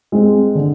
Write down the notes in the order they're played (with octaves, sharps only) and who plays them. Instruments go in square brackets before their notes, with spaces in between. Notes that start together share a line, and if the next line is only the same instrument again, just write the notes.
[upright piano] G#3 C4
D3